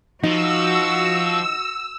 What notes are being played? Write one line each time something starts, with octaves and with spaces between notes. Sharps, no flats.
F3 D#4 F#4 E6